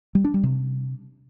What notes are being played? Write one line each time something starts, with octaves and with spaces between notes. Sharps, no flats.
G3
D4
G3
C3